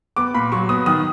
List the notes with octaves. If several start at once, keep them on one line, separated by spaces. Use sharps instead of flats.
B3 D6
A#2 B5
F#3 C#6
B3 D#6
D#3 D#6